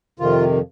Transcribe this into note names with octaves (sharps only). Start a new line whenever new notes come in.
F2 C3 D#3 F4